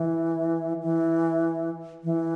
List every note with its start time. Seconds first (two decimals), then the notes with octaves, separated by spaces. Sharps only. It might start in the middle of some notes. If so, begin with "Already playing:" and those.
Already playing: E3
0.82 E3
2.04 E3